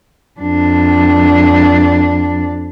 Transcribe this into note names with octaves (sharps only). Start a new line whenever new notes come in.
F2 D4